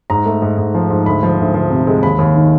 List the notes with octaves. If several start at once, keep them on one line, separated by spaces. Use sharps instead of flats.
G#2 A#5
A3
G#2
G#2
F3
G#2
D2 B5
F3
D2
F3
C3
G#3
D#2 B5
D#2
D#3